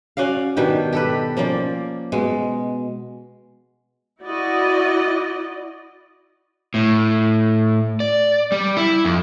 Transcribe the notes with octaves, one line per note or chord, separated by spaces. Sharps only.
C#4 F#4 D5 F5
B2 D#3 D4 G4
G4 A4 B4
F3 A#3 C#4 D5
B2 G#3
E4 F#4 D5 D#5
A2
D5
G3
E4
F2